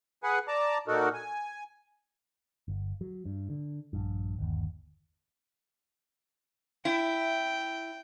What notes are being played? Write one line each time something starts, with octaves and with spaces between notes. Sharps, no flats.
G#4 B4 F#5 G#5
D5 A5 A#5
A#2 D#4 F#4 A4 A#4
G#5
G1
F#3
G2
D3
A#1 G2
G1 D#2
E4 G5